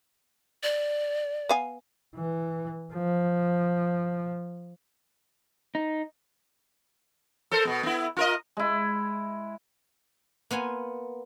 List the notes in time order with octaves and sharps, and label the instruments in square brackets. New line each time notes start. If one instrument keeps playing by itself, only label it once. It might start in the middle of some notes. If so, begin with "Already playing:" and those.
[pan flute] D5
[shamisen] B3 F5 G#5
[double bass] E3
F3
[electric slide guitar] D#4
[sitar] A4 A#4 C5
B2 B3
B3 E4
F4 A#4 D#5
[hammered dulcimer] G#3 E4
[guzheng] A#3 B3 F4 G#5